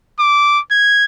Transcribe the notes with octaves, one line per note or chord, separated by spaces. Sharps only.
D6
G#6